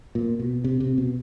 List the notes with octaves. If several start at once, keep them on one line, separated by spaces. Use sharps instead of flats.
A#2
B2
C3
C3
B2